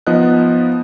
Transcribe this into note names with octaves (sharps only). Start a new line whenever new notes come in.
F3 B3 D#4 D#5 F#6